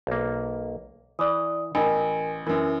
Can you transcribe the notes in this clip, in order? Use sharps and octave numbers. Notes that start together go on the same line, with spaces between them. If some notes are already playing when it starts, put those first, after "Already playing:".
B1 A#3
E3 D5 D#6
A1 A#4 G#5 A5
F#2 E3 A#4